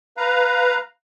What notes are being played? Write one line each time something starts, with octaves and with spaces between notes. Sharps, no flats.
B4 F5 A#5